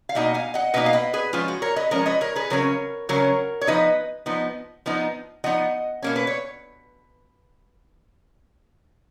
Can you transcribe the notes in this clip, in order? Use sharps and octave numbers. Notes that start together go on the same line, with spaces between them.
F5
B2 A#3 D#4 D#5 F#5
F5 G#5
D#5 F#5
B2 A#3 D#4 B4 D#5
F5
B4 D#5
G#4 B4
F3 G#3 C#4 F4
F#4
A#4 C#5
B4 D#5
F3 G#3 C#4 A#4 C#5
B4 D#5
A#4 C#5
G#4 B4
C#3 F#3 C#4 A#4 C#5
C#3 F#3 C#4 A#4 C#5
C#5
F3 B3 D#4 B4 D#5
F3 B3 D#4
F3 B3 D#4
F3 B3 D#4 D#5 F#5
B2 A#3 C#4
B4
C#5